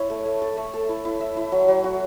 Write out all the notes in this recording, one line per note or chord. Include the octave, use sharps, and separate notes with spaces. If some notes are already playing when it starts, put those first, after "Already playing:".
Already playing: E4 C#5
A3
A3
A4
A3
A4
E4
E4
E5
E4
F#3
F#3
F#4